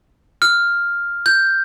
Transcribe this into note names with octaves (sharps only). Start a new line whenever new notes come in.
F6
G6